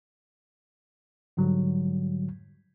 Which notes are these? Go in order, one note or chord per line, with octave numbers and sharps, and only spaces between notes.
G#2 D3 F#3 G3